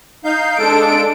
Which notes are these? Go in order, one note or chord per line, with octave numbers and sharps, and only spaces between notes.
D#4 F5 G6
G#3 D4 A4 D7